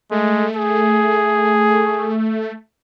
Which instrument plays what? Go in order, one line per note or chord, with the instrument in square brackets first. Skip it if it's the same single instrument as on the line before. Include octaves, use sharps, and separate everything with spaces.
[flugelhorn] G#3 [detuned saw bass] A3
[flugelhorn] G#4